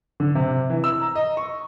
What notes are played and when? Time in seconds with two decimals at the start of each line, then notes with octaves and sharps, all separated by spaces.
0.20 D3
0.35 C3
0.70 E3
0.84 E6
1.01 A#5
1.15 D#5
1.37 C#6